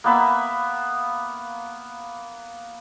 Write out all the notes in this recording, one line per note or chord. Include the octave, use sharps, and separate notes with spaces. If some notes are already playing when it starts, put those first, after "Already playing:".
A#3 B3 E5